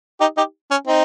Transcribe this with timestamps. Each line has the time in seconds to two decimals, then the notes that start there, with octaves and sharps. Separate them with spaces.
0.20 D#4 G4
0.37 D#4 G4
0.71 C#4
0.87 C4 D#4